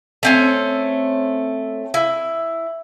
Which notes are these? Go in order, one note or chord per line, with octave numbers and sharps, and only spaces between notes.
A3 C4 C#4
E4